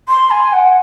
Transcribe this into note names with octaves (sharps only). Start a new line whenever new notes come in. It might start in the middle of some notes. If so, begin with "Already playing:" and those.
C6
G#5
F#5